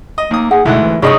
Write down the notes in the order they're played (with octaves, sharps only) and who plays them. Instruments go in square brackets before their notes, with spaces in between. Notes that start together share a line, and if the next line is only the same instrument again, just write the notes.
[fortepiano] D#5
[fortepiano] D#2 D#6 [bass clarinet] A#3
[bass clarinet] G#4 [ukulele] F#5
[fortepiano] D2 G#2 F#5 [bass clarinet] B2 [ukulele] E4
[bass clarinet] E3
[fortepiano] C2 F#2 [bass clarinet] G3 [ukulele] D#4 G#4 [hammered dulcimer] C#5 D#5 C#6